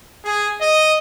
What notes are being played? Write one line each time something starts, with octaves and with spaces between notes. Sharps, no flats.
G#4
D#5